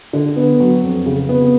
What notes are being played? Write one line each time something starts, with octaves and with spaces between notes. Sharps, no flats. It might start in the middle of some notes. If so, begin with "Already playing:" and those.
D3
B3
F#3
F2
C#3
B3